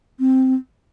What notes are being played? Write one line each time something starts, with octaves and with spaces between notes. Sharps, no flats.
C4